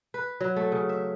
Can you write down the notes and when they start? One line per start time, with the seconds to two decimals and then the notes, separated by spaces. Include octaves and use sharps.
0.14 B4
0.41 F#3
0.56 A3
0.72 C#3
0.89 E5